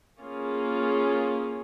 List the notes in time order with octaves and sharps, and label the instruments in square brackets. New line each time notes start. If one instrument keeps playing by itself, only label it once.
[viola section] A#3 C#4 F4 G#4